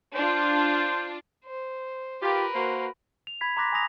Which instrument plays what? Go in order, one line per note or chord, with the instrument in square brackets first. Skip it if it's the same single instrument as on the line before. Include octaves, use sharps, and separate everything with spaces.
[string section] D4 F4 [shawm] C5
[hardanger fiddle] C5
[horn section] F4 G4 [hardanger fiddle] A#4 B4
[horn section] A#3 F#4 C5
[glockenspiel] F7
B5 G#6 B6
A#5 C6 D6 F#6 A#6 B6
G#5 A#5 B5 D#6 A#6 F7